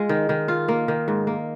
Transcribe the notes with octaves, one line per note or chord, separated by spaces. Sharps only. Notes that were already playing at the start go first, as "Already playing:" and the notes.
Already playing: G#3 F4
D#3
D#3
F4
A#3
D#3
G#2
A#3